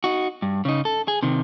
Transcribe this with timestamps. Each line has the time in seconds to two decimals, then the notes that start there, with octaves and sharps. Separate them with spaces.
0.04 D#4 F#4
0.42 G2
0.65 C#3 D#4
0.85 A4
1.08 G#4
1.22 C3 D#3